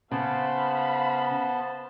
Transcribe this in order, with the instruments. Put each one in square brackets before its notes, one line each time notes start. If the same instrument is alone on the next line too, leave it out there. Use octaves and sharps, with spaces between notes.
[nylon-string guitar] C#3 [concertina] B3 C5 A5 [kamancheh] F5 B5